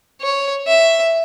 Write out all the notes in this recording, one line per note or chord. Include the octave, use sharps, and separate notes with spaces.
C#5
E5